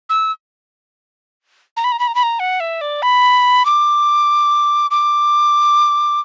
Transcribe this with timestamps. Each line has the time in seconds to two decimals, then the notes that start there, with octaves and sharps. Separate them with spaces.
0.10 E6
1.77 A#5
1.84 B5
1.92 A#5
1.99 B5
2.08 A#5
2.15 B5
2.23 A#5
2.40 F#5
2.60 E5
2.81 D5
3.02 B5
3.65 D6
4.91 D6